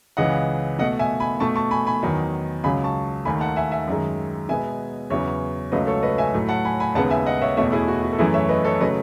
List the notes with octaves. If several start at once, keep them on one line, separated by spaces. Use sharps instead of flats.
C#2 C#3 E3 D#5 F#5
B2 A3 D#5 F#5
E5 G#5
G#5 B5
B2 A3 A5 C#6
A5 C#6
G#5 B5
G#5 B5
E2 D#3 F#3
C#2 C#3 F#3 G#5 B5
A5 C#6
D#2 D#3 A3 G#5 B5
F#5 A5
E5 G#5
E5 G#5
F#2 D#3 G#3
B2 G#3 B3 E5 G#5
E2 C#3 F#3 B3 C#5 E5
C#2 C#3 F#3 A3 B4 D#5
A4 C#5
B4 D#5
E5 G#5
A2 F#3 A3
F#5 A5
G#5 B5
G#5 B5
D#2 C#3 G#3 B3 F#5 A5
E5 G#5
D#5 F#5
C#5 E5
E2 B2 A3 C#5 E5
E4 G#4
F#4
F#4
A4
F#2 E3 A3 E4 G#4
C#5 E5
B4 D#5
A4 C#5
C#3 F#3 A3 B4 D#5